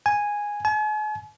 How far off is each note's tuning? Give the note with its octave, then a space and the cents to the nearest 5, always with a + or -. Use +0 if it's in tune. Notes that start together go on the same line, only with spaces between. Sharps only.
G#5 -5
G#5 +45